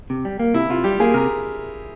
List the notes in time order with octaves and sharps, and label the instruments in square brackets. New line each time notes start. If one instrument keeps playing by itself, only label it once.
[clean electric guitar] C3
G3
A#3
[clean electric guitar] C3 [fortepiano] E4
[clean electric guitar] C3 [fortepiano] F4
[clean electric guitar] G3 [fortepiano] G4
[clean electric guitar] A#3 [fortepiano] G#4
[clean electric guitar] C3 [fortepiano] A#4